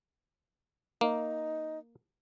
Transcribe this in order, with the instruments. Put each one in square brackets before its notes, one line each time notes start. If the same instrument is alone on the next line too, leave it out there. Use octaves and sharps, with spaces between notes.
[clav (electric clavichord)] A#3 [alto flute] D#4